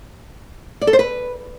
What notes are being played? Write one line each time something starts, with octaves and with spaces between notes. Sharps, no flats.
D5
A4
C5
B4